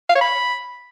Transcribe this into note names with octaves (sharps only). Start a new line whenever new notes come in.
F5
C#5
B5